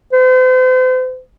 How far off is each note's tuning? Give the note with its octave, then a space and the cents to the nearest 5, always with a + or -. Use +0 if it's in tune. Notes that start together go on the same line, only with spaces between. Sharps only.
C5 -40